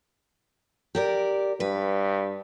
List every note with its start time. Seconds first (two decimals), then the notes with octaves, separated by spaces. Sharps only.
0.95 G4 A#4 D5
1.60 G2 B4